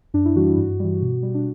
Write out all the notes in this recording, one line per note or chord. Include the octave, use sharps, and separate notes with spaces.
F#2 D4
E4
E3 G3 F#4
F#4
G2
E3 G3
B2
G3
D4